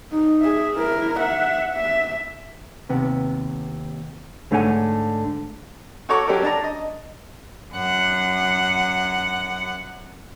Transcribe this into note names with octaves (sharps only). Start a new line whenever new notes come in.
D#4
G#4 E5
E4 A#4
E5 F#5
E5
D#2 C3 B3
G#2 D3 A3 C#5 F#5 G#5
F#4 A4 C#5 A#5 C#6 D6
F#3 C#4 G4 A4 A#4
D4 A5 A#5
D#5
F#2 F#5